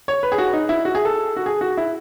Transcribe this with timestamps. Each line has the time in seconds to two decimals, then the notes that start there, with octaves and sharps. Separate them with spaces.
0.08 C#5
0.23 B4
0.32 G#4
0.38 F#4
0.53 D#4
0.69 E4
0.85 F#4
0.95 G#4
1.05 A4
1.36 F#4
1.46 G#4
1.61 F#4
1.77 E4